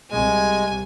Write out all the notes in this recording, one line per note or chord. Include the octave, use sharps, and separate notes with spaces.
C2 C3 G#3 G#5